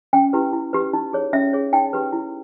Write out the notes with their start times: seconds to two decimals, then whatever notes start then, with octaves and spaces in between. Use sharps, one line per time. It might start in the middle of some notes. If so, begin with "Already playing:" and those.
0.13 C#4 G5
0.33 E4 G4 B4
0.53 E4
0.73 G4 B4
0.93 D#4
1.13 G#4 C#5
1.33 C#4 E5
1.53 G#4 C#5
1.73 D#4 G5
1.93 G4 B4
2.12 E4